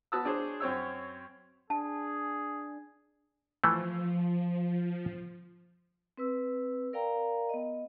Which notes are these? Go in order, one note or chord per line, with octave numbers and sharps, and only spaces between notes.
B3 F#4 A5 D#6 E6
D4 G#4 C5 C#5
F#2 C4 C#5 E6
D4 G#4 A5
E3 F3 A3
C4 B4 E6
A#4 D5 F5 G5 A#5
B3 D#5